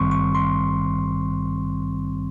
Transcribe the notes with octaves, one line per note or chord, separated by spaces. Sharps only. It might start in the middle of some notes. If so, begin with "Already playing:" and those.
Already playing: G#1 G2 D#3 G3 C4 C6 C#6
C#6
C6